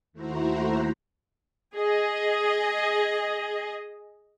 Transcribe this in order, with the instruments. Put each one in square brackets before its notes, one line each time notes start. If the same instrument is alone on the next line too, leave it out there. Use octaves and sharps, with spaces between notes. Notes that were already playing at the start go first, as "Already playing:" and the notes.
[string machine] D#2 A3 E4 F#4 C5 A#5
[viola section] G#4 D#5